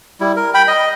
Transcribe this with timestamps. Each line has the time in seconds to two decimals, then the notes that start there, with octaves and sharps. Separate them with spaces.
0.20 G3 E4
0.36 A#4
0.54 G5 B5
0.68 D#5